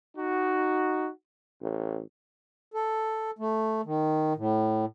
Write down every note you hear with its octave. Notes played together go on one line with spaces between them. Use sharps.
D#4 F#4
A1
A4
A3
D#3
A2